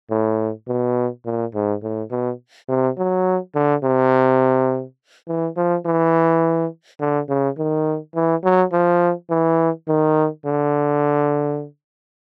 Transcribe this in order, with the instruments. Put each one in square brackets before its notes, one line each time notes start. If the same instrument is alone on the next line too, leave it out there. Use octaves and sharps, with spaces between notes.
[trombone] A2
B2
A#2
G#2
A2
B2
C3
F#3
D3
C3
E3
F3
E3
D3
C#3
D#3
E3
F#3
F3
E3
D#3
D3